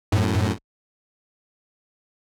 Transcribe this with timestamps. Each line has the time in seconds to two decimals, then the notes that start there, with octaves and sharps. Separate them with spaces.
0.12 F#2 A2